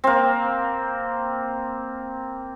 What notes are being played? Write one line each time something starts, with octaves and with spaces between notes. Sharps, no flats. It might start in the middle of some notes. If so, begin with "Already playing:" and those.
A#3 C4